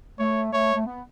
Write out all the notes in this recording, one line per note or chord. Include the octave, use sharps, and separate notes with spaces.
A3 C#5
A3 C#5
A3
B3